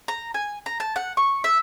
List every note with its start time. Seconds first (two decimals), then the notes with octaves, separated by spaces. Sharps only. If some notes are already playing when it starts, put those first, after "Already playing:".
0.08 A#5
0.34 G#5
0.66 A#5
0.80 A5
0.96 F#5
1.17 C#6
1.44 E5